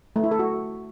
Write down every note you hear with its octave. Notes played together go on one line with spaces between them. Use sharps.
A3
E4
A4
F#4